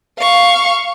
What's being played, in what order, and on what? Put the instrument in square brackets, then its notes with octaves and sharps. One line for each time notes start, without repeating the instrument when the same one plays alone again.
[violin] F5 C#6